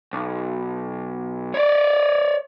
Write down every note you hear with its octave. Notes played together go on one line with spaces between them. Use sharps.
B1
C#5 D5